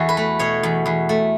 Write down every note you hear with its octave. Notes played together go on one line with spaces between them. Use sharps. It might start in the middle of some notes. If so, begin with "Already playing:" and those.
Already playing: E2 E4 F#4 A4
B4
A3
B2 C#5
E2
E2
A3